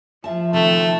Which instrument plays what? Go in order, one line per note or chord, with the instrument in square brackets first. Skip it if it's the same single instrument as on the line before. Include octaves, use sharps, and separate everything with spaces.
[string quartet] F3 [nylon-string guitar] E5 A5
[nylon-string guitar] C3 D#3 [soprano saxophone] A3